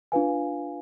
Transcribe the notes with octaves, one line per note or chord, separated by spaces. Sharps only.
D4 F4 B4 F5 G#5